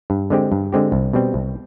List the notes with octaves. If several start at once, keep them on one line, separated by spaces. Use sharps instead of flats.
G2
D3 G#3 C4 G4
G2
D3 G#3 C4 G4
C2
B2 G3 C4
C2